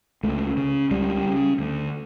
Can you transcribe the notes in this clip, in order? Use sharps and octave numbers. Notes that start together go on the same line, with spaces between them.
C#2 A3
C#3
C#2 G3
C#3
D2